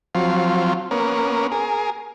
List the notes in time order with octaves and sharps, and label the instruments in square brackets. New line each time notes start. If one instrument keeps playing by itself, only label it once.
[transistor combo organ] F3 F#3 C4 F4
A#3 B3 C#4 A#4
G#4 A#4